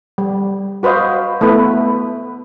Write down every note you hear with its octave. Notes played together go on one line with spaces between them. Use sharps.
G3
F#4 B4 C5 D#5 F5
A3 B3 E4 B4